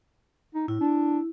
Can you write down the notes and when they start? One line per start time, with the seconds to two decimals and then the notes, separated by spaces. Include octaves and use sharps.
0.55 D#4
0.68 A2 E4
0.81 D4